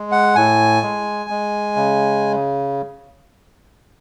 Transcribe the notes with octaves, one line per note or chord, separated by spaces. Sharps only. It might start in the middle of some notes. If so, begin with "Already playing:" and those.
Already playing: G#3
F#5
A2 G#5
G#3
G#3
C#3